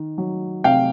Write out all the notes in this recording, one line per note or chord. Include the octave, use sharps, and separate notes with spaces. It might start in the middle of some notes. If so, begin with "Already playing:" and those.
Already playing: D#3
F#3
C3 F5 G5